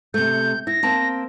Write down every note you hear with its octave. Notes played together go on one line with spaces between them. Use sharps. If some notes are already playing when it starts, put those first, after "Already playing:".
C3 A3 G6
E4 A#6
A#3 C4 A5